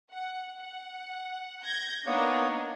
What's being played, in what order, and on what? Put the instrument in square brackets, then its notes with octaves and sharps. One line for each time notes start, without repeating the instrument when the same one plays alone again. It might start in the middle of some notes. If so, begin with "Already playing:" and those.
[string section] F#5
F#5
G6 G#6 A#6
[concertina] A#3 B3 C#5 [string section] D4 D#4 A#4